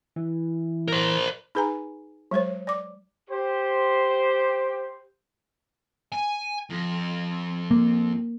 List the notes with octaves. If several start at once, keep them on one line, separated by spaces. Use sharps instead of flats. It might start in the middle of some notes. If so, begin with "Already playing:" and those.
E3
A#4 C5
D#4 G#4 B4 G#5 A#5
F#3 G#3 C5 C#5
D5 D6
G4 C5
G#5
F2
A#3